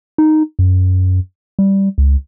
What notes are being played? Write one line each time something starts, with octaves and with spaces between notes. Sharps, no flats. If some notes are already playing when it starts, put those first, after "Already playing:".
D#4
F#2
G3
C#2